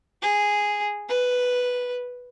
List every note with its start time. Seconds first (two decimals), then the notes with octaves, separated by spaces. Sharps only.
0.22 G#4
1.09 B4